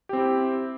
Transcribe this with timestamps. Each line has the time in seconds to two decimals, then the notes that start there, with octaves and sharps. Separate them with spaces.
0.09 G4
0.13 C4
0.17 E4